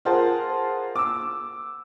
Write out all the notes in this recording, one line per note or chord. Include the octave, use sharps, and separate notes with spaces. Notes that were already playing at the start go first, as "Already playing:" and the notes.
F4 G#4 A#4 C5 F#5 A5
D6 E6